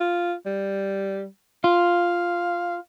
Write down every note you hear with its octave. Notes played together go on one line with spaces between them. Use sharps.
F4
G3
F4 F5